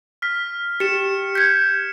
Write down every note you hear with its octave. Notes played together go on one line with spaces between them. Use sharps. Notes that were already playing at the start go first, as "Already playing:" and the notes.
F6 B6
G4 C#7 E7
G6 G#6 B6 C#7